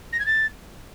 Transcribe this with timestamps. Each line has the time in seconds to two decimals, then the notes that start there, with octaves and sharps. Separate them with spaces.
0.12 A#6
0.19 G#6
0.26 A6